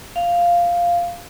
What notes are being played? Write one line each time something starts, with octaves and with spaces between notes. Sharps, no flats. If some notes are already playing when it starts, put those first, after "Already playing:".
F5